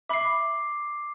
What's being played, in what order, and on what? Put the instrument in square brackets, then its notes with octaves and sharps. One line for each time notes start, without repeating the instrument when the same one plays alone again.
[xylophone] E5 B5 [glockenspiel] D6 C7